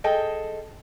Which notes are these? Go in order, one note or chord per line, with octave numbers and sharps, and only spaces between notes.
G#4 A4 D#5 G5